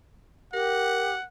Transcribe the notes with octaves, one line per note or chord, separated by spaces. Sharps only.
G4 A#4 F#5